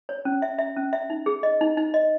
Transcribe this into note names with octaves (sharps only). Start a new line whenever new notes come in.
C#5
C#4
E5
E5
C#4
E5
D#4
G#4
D#5
D#4
D#4
D#5